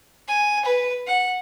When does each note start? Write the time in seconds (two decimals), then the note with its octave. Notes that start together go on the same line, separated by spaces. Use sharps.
0.28 G#5
0.65 B4
1.07 F#5